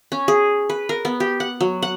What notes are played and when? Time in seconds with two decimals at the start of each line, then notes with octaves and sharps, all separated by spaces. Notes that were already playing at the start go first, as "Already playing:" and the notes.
0.12 C#4
0.28 G#4
0.69 B4
0.89 A#4
1.05 B3
1.20 G4
1.40 F#5
1.61 F#3
1.82 F#5